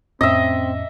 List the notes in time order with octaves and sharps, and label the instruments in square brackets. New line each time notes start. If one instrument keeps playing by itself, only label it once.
[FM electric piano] F2 A2 C#4 [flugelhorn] C4 [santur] D#5 E5